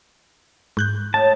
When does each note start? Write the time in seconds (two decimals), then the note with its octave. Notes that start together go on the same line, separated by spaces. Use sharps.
0.77 G#2 F#6 G6
1.14 A2 D#5 A5